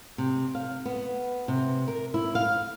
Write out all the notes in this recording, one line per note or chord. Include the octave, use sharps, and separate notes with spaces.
C3
F5
B3
C3
A#4
E4
F5